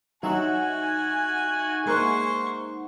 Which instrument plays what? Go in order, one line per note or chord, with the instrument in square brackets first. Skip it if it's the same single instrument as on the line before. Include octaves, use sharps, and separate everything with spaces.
[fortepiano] F#3 [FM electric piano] D#4 E5 F#5 [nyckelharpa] F#4 [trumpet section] G#5
[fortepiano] G#3 A#3 F#6 [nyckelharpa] C5 C#6